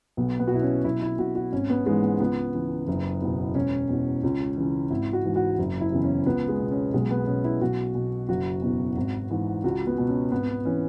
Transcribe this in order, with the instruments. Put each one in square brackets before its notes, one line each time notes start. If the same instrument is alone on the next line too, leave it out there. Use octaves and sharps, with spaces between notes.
[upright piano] B1 B3
B3
F#4
B2 E4
C#4
B1 E4
E4
B2 F#4
F#4
G#1 C#4
B3
G#2 E3 G#3
B3
C#2 B3
C#3 E3
F#1
E2 B2
E1 C#4
E2 B2
C#2
C#3 E3
G#1 E4
F#4
G#2 E3
F#4
F#1
E4
E2 C#3 E3
C#4
C#2 B3
G#3
B2
C#4
B1 G#3
B3
B2 C#4
E4
B1 F#4
B2
F#1 F#4
E2 B2
G#1
G#2 E3
C#2 F#4
B3
B2
C#4
G#1 B3
E3 C#4